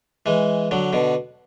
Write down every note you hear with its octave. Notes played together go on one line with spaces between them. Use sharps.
E3 G#3
D3 F#3
B2 D3